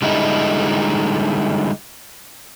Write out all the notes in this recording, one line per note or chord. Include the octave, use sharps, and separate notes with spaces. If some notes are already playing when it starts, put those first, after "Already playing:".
D3 G3 G#3 D#4 E4